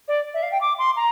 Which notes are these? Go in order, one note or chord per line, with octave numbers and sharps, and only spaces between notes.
D5
E5
F5
G5
D6
C6
A#5